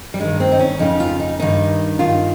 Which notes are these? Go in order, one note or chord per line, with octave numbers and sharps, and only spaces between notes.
G3
G2 D#3 G#3
C4
D#4
C#4
F2 C#3 D#4
F4
D#4
G2 D#3 D#4
G2 D#3 F4